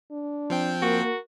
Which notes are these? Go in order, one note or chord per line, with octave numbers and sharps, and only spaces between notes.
D4
F3 C4 G5
A#3 F#4 A#4